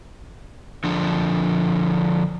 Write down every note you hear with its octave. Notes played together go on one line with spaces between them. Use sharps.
D3 F3 D4